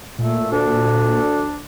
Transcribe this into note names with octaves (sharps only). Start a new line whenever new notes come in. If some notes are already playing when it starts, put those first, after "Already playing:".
A#2 A3
D2 D4